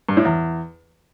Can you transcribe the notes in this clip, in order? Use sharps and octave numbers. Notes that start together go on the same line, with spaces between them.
G2
A2
E2